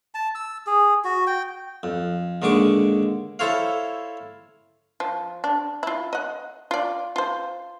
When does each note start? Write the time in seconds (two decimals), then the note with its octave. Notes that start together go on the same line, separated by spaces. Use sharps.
0.15 A5
0.35 E6
0.67 G#4
1.04 F#4
1.27 G5
1.83 F2
2.42 D#2 D3 G#3 C#6 D6
3.39 E4 A4 C5 C#5 F5
5.00 F3
5.44 D4
5.83 E4 F4
6.13 D#5 F#5
6.71 F4 D5
7.16 F4 C5